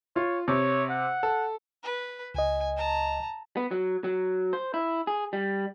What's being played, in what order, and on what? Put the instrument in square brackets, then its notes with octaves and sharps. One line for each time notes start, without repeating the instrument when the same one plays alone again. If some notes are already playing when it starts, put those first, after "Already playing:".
[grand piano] F4 [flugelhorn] C#5
[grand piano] C3 [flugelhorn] C#5
[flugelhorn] F#5
[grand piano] A4
[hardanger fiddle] B4
[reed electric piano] C#2 D#5 [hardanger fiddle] G#5
[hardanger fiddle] A5 A#5
[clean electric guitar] B3
F#3
F#3
C5
E4
G#4
G3